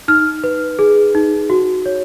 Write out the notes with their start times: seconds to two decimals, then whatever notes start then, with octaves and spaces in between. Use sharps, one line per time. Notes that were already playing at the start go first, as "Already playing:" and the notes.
0.08 D#4 F6
0.44 B4
0.79 G#4
1.15 D#4
1.50 F#4
1.86 C#5